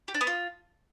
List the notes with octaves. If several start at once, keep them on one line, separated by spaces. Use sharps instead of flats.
G4
D4
B3
F4